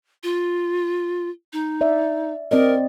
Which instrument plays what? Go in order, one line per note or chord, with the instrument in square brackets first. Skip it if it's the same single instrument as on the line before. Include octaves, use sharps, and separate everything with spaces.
[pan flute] F4
D#4
[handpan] D5 E5
[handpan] C4 D5 D#5 [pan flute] A#4